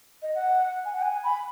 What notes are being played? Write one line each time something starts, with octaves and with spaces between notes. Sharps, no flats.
D#5
F#5
G#5
F#5
G#5
B5